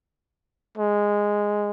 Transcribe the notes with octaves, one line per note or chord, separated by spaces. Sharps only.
G#3